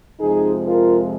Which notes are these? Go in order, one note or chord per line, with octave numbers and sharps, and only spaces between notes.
F2 C3 F3 G#3 D#4 G#4
F4 A#4